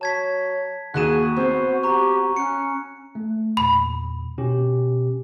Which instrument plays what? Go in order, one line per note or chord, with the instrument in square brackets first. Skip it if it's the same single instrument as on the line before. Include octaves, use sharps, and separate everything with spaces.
[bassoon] F#3 [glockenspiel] A5 G#6 B6
[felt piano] D#2 F#5 E7 [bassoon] F#4 [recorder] G#4 [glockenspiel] F#6 D#7
[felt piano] B3 C4 [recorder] C5
[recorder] G4 [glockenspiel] A#5 C#6
[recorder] C#4 [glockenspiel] F#6 C#7
[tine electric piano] A3
[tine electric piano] E2 A#2 [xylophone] B5
[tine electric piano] B2 C#4 G4